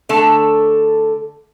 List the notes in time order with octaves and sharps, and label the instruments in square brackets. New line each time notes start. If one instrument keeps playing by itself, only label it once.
[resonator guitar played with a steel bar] D3 A3 A4